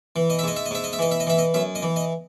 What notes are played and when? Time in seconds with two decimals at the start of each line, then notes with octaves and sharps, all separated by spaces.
0.16 E3
0.30 D#5
0.39 E5
0.44 G#2 D#5
0.56 E5
0.66 D#5
0.71 G#2 E5
0.84 D#5
0.93 E5
0.99 E3 D#5
1.11 E5
1.20 D#5
1.27 E3 E5
1.38 D#5
1.54 F#2 E5
1.75 D#5
1.82 E3
1.96 D#5